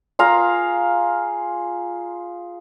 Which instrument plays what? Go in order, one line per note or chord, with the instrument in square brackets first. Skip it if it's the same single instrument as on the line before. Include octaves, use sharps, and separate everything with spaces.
[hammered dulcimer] F4 G#4 F5 A#5